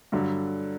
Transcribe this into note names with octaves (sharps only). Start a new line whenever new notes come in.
G2 D3 F#3